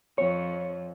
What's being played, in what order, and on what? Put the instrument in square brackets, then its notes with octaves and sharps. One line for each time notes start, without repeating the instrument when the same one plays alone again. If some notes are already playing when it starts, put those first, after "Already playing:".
[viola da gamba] F2 [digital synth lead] C#5